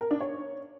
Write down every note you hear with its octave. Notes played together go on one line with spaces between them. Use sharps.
A#4
D4
C#5